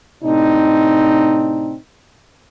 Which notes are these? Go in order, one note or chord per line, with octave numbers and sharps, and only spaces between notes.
A2 C3 C4 D4 D#4